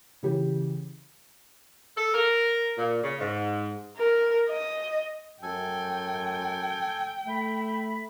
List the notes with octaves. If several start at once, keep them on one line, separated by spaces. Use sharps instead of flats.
C#3 E3 G4
A4
A#4
A#2
C#3
G#2
A#4
D#5
F#2 A4 G5 G#5
A3 E5 B5